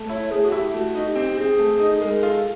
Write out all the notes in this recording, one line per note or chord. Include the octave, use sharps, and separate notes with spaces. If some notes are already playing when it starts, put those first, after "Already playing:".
Already playing: A3
E4 C#5
A3 G#4
F#4
E4 G4
A3 F#4
D#4
G4
C4
G4
C4 G#4
A3
D#4
A4
G#3 A#4
F4 A4